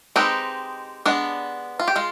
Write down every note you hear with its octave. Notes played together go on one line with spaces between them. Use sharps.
G#3 C4 D#4 G4 B4
G#3 B3 D4
F4
G4
G#3 F4